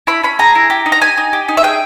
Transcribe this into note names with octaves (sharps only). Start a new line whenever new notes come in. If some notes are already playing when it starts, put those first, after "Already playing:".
E4 B5
C#4 B5
G#4 A#5
E4
G4
D#4
A#5
G4 G#5
D#4
G4
D#4
E5
G#4 G5